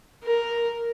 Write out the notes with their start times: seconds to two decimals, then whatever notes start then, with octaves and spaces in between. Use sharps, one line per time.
0.23 A#4